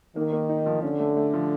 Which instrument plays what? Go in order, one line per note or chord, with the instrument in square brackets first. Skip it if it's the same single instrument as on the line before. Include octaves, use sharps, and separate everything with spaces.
[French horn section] D#3 [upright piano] A#3
[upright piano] A#3
D#4
F3
[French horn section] D3 [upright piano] C#4
[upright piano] A3
A3
F3